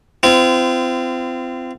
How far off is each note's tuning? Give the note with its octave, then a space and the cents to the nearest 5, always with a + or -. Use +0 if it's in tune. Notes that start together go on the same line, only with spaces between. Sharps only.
C4 -25 F4 -40